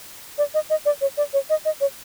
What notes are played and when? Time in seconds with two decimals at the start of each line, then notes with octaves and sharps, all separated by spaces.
0.38 D5
0.54 D#5
0.70 D#5
0.86 D5
1.01 C#5
1.17 D5
1.33 C#5
1.50 D#5
1.65 D#5
1.81 C#5